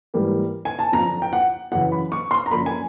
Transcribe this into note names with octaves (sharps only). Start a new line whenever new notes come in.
G#2 E3 G3 A#3
G#5
A5
F2 D3 F3 A#5
G5
F#5
F#2 C#3 E3 F#5
B5
C#6
C6
A#5
F#2 D3 F3 A#3 B5
G#5